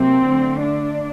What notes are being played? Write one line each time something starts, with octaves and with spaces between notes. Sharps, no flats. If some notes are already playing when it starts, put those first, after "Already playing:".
Already playing: C3 F#3 A#3 C4
D3 A3
D4